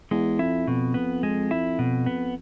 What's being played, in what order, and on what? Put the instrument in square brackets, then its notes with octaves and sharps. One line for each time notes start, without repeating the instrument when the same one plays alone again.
[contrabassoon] E2 [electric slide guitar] G#3
[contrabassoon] F2 [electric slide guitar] E4
[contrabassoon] F2 [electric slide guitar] B2
[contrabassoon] F2 [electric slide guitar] B3
[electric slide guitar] G#3
E4
B2
B3